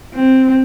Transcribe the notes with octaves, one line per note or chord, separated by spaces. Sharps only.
C4